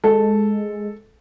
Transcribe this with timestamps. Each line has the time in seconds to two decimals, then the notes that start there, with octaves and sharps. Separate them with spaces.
0.04 G#3 A4